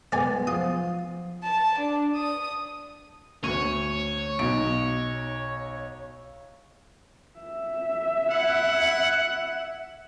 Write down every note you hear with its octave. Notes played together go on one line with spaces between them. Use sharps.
G#3 B3 D5 G#5
F3 F#3 F4 C5 D#6
A5
D4
D#6
D2 C#5 D#7
B1 D#4 D7
E5
E4 F#5